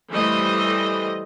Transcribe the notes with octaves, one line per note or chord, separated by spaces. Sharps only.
E3 G3 A3 C5 D#5